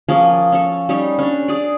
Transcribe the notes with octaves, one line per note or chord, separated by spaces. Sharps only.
F3 A#3 C#4 G#4
C#4 A4
G3 C#4 D#4
C#4 D4
G#4 D5